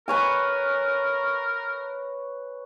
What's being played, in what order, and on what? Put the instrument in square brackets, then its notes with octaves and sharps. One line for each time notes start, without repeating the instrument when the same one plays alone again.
[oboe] A#4 [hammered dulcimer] B4 C#5 G#5